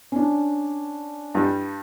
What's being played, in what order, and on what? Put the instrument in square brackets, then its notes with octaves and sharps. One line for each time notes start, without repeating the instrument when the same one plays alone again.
[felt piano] C#4 D4
[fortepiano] G2 G3